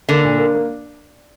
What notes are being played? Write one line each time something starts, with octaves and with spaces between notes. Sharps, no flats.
D3 A#3
A#2
A#3
A#3